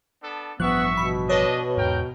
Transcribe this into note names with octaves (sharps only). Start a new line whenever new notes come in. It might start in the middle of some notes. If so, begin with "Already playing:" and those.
B3 D4 A4
A1 G2 F3 B3 E5 C#6 F#6
B2 B5
D4 B4 C#5 D#5
E2 G#2 A#4 G5